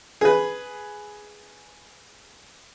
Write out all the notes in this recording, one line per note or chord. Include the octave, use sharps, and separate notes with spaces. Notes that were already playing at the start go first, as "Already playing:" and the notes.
G#4 B4